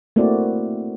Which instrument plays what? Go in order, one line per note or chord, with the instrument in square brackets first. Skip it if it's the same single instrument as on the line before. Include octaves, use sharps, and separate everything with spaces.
[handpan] A3 A#3 C4 E4 F#4 D5